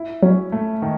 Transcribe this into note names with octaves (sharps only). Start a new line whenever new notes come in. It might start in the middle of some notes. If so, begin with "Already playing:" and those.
Already playing: E4
F#3 C#4
A3
D#3